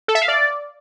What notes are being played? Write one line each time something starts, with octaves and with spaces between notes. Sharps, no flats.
A4
E5
F5
D5